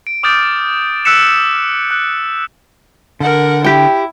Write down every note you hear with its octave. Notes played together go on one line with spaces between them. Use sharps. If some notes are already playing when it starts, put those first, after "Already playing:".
D7
D6 D#6 F6 G6 A6 D7
E6 F#6 B6 C#7 E7
F#6
D3 A#4 F#5
E4 G4 G5